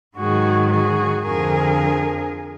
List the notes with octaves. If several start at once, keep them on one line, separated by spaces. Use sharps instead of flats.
G#2 D#3 F#3 F#4 G#4
F#4 G#4
F2 D3 F3 G#4 A#4